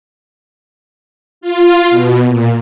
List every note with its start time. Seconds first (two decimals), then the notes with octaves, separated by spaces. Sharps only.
1.41 F4
1.90 B2
2.28 A#2